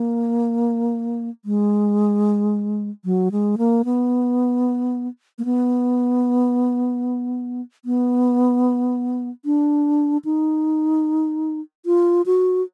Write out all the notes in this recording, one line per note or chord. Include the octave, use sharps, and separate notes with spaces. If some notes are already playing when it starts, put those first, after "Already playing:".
Already playing: A#3
G#3
F#3
G#3
A#3
B3
A#3
B3
B3
D4
D#4
F4
F#4